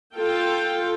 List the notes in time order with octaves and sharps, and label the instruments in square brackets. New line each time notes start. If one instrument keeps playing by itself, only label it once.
[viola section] F4 A4 G5